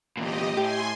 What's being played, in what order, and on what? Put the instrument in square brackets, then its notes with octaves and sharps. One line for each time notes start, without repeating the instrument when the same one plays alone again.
[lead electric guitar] E2 A#2 [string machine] G4 D#5
[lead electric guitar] A2 [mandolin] G4 [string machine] G#5 C6